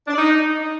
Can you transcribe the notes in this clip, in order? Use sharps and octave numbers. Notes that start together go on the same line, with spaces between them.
D4
D5
D#4